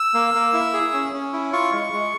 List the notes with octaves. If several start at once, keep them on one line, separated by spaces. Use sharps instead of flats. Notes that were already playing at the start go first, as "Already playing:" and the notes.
Already playing: E6
A#3
A#3
E4
G#4
C#4
C#4
E4
F4 C#6
G#3
G#3